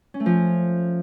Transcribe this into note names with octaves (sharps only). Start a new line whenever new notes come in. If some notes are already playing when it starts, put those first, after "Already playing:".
C#4
A3
F3